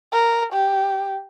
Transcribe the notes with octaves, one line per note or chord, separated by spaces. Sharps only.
A#4
G4